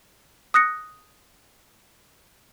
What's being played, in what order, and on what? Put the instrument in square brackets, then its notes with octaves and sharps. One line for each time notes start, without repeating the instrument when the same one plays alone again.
[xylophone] D#6 F#6 A#6 C#7